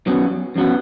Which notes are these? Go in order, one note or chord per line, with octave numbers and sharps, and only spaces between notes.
F#2 F#3 B3
F#2 F#3 B3